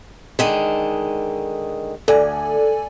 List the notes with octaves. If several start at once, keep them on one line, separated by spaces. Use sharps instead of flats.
D3 D#3 G#3
D2 A4 D5 G#5